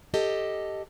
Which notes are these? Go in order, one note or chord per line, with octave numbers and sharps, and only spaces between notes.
G4 A4 D#5